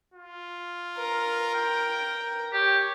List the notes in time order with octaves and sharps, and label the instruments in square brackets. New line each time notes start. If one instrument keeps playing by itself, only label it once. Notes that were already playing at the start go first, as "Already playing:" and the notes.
[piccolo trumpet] F4
[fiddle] A#4
[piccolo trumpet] G5
[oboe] G4 [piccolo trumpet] C#5